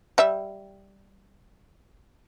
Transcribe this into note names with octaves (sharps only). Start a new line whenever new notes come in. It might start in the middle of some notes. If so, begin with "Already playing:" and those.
G3 E5